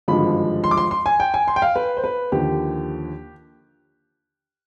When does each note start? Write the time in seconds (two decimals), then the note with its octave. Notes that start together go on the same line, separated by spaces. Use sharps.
0.08 G#1 G2 D3 F3 G#3 B5
0.64 C6
0.71 D6
0.77 C6
0.91 C6
1.06 G#5
1.20 G5
1.34 G#5
1.48 C6
1.56 G5
1.62 F5
1.76 B4
1.97 C5
2.04 B4
2.32 D#2 D3 F3 G4